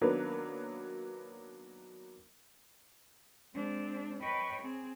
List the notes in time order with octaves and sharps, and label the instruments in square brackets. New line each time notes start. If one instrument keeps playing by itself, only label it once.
[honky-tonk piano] D#3 F#3 A#3 B3 D4 B4
[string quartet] G#3 C4 D4
B4 C#5 D#5 G5 B5 C#6
C4 G#4